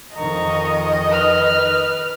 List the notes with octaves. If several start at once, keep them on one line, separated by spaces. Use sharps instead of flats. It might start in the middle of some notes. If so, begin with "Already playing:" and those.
F2 D#3 D#5 A#5 C#6
B4 F6